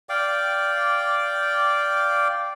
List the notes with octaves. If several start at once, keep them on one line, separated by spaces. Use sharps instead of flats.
D5 F5 G5 D6